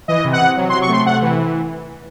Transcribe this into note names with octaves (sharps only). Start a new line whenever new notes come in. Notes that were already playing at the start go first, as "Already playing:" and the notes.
E3 D#5
C3
F#5
C3
F#3
C6
C3
C#6
A3 C6
C3 F#5
E3